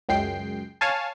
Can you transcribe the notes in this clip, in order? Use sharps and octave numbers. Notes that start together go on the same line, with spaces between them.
C#2 F#2 G#3 G5 C7
C#5 F5 G#5 A5